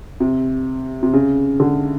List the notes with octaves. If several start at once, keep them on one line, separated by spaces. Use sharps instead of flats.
C3
C3
C#3
D3